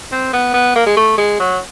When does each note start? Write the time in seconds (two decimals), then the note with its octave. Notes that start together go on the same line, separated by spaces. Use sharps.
0.12 C4
0.33 B3
0.54 B3
0.76 A#3
0.86 G#3
0.97 A3
1.18 G#3
1.40 F#3